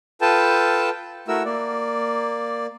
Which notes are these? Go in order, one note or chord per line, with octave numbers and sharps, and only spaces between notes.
F4 A4 B4 G5 A5
A3 E4 F#4 A#4 E6
A#3 D5